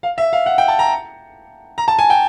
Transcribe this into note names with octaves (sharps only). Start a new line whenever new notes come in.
F5
E5
F5
F#5
G5
A5
A#5
A#5
A5
G#5
G5